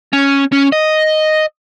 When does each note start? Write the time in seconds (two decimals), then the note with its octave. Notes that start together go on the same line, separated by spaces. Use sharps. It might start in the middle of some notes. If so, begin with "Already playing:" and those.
0.13 C#4
0.52 C#4
0.72 D#5